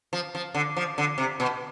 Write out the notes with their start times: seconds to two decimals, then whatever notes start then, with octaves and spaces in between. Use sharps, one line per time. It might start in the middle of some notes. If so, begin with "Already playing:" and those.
0.13 F3
0.35 F3
0.54 D3
0.76 F3
0.98 D3
1.18 C3
1.40 B2